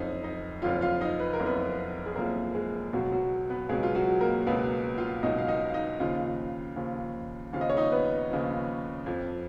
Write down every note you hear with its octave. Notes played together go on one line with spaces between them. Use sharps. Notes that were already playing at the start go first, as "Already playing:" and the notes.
Already playing: F#1 F2 F3 D#4 D#5
D#4 D#5
F#1 F2 F3 F4 F5
F4 F5
D#4 D#5
B4
A#4
F#1 F2 F3
B3 B4
G#4
F#1 F2 F3 A#3 A#4
G#3 G#4
C#2 B2 F#3 F#4
F#3 F#4
B3 B4
C#2 B2 F#3 G#3 G#4
F4
F#3 F#4
A#3 A#4
C#2 B2 F#3 B3 B4
F4 F5
C#2 B2 F#3 D#4 D#5
F5
D#4 D#5
F5
D#4 D#5
D#2 C#3 F3 F4 F5
D#2 C#3 F3
D#2 C#3 F3 F5
D#5
C#5
D#4 D#5
B3 B4
D#2 C#3 F3
F2 F3